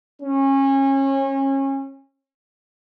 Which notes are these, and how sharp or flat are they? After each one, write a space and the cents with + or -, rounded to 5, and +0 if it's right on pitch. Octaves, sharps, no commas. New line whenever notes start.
C#4 -30